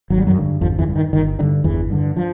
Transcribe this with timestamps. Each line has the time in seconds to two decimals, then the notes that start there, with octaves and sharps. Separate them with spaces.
0.10 G#1 F#3
0.18 G3
0.27 F#2 F#3
0.36 G2 D3
0.61 G#1 F2 F3
0.79 E2 E3
0.87 G2 D3
0.96 D#3
1.13 G1 D#3
1.39 D3 D#3
1.43 G2
1.64 G1 E2 E3
1.90 G2 D3
2.17 F3